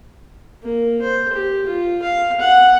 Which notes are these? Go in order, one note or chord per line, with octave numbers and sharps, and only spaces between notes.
A#3
C5
G4
F4
F5
F#5